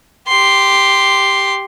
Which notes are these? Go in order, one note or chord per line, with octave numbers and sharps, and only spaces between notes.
G4 C6